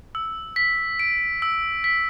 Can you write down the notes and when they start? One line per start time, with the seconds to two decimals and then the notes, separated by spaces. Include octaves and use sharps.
0.15 E6
0.56 B6
0.99 D7
1.42 E6
1.84 B6